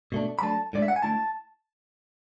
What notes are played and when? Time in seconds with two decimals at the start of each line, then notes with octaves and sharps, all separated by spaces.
0.12 B2 A3 D4
0.39 B5
0.42 F#3 A3 D4 A5
0.73 A2 G#3 D4 D5
0.82 E5
0.88 F#5
0.96 G#5
1.02 D3 A3 E4 A5